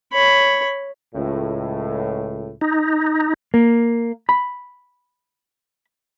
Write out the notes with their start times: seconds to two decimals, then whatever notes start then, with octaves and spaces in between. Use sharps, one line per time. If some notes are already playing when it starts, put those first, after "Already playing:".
0.13 C#5 B5
1.15 C#2 A2
2.61 D#4
3.54 A#3
4.29 B5